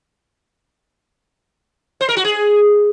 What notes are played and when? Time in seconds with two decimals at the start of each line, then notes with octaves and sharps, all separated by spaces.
2.01 C5
2.09 A#4
2.17 F#4
2.25 G#4